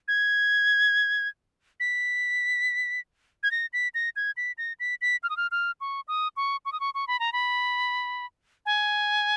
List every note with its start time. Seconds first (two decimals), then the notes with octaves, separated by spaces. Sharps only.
0.08 G#6
1.80 B6
3.43 G#6
3.51 A#6
3.73 B6
3.94 A#6
4.16 G#6
4.37 B6
4.58 A#6
4.80 B6
5.01 B6
5.23 F6
5.30 D#6
5.37 F6
5.51 F6
5.81 C#6
6.08 D#6
6.37 C#6
6.65 C#6
6.72 D#6
6.80 C#6
6.95 C#6
7.08 B5
7.20 A#5
7.33 B5
8.66 G#5